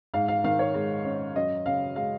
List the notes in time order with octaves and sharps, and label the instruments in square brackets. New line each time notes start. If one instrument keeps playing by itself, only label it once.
[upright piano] G#2 [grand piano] F5
[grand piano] F5
[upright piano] D#3 [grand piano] F5
[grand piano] C#5
[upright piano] G#3
C#4
[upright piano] F#2 [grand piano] D#5
[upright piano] C#3 [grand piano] F5
[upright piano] G#3 [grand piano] F5